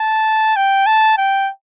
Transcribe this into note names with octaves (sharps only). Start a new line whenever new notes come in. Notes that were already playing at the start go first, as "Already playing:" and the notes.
Already playing: A5
G5
A5
G5